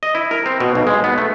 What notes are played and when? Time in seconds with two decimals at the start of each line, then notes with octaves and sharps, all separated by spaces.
0.03 D#5
0.15 E4
0.31 A#4
0.46 C4
0.60 B2
0.75 B1
0.87 G#3
1.04 B3
1.18 A3